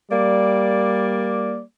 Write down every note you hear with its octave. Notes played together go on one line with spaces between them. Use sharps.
G3 A#3 D5